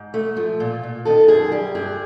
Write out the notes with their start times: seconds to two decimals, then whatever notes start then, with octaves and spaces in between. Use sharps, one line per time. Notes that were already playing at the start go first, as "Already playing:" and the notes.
Already playing: G#2
0.14 A3
0.37 F3
0.60 A#2
0.83 A#2
1.05 D#3 A4
1.28 F#2 G#4
1.52 G3 G4
1.75 G2 G#4